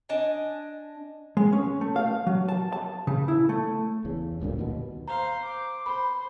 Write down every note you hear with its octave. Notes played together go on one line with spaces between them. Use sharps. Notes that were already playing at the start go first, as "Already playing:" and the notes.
D4 D#5 G#5
G#3
C#4
A3
F5
F#3
A5
A5
C#3
E4
A3
E2 C#3
D1 D2 G2 A#2
D#2 B2
C5 F5 A#5
D6
C5 B5